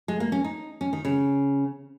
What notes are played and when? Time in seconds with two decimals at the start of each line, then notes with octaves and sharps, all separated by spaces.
0.08 G#3
0.20 A#3
0.32 C#4
0.44 D#4
0.81 C#4
0.93 D#3
1.05 C#3